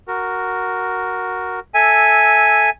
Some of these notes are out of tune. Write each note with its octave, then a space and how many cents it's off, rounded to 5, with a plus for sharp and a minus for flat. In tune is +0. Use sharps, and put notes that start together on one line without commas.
F#4 +0 A#4 +0
A4 +0 E5 -10 G#5 +0